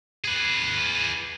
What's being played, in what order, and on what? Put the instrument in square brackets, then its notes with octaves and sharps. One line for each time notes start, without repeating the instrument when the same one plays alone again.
[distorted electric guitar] G#4 B4